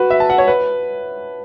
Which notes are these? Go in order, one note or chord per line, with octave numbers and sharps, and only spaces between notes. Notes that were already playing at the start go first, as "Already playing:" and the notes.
Already playing: F#4 B4
E5
A5
F#5
C#5
B4